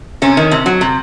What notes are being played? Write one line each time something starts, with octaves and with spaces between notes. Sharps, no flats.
C3 C#4
D#3
C3
F#3
C3